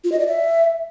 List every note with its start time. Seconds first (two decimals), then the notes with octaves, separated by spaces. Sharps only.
0.04 F4
0.12 D#5
0.20 D5
0.27 E5